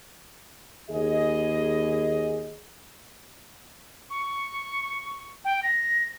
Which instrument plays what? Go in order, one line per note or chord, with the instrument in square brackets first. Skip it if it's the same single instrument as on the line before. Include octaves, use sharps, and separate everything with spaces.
[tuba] D#2 [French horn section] G#4 D#5
[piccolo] C#6
G5
A#6